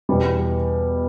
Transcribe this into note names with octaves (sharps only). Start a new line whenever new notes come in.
E2 B2 G3